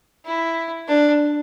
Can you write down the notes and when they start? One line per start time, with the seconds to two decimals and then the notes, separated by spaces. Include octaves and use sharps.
0.25 E4
0.87 D4